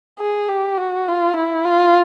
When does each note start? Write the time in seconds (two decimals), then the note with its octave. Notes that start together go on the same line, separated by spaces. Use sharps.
0.20 G#4
0.49 G4
0.78 F#4
1.08 F4
1.36 E4
1.65 F4